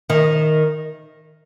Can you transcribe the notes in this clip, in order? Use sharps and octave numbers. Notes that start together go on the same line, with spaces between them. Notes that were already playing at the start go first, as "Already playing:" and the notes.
D#3